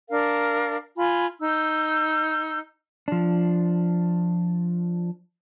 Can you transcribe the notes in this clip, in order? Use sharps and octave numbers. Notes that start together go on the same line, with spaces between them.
D4 A#4 F5
F4 G#5 B5
D#4 E6 G6
F3 D4